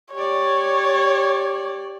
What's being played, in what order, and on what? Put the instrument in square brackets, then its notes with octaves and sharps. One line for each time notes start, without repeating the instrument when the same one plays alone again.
[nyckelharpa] G4 D5 [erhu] C#5